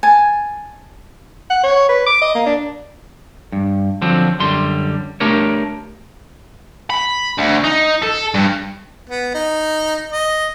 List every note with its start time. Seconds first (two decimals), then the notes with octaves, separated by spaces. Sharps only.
0.03 G#5 A5
1.50 F#5
1.64 C#5
1.89 B4
2.06 D6
2.22 D#5
2.35 A#3
2.46 D4
3.52 G2
4.02 D3 F3 F#3 C4
4.39 F#2 D3 G3 C6
5.20 A3 D4 G4 A#4 C#5
6.90 B5
7.38 D2
7.64 D#4
8.02 A4
8.34 G2
9.09 B3
9.34 D#4
10.13 D#5